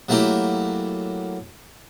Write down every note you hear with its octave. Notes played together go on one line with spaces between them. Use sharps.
F#3 A3 A#3 E4 G4